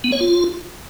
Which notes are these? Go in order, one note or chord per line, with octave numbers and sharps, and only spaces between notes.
B3
C#5
F4